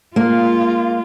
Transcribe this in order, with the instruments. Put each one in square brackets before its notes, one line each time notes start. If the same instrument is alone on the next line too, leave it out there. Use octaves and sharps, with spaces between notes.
[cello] G#3 F4 [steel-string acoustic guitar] A#3